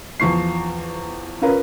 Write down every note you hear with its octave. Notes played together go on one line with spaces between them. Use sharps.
E2 F3 C#6 C7
C#4 F4 A#4 B4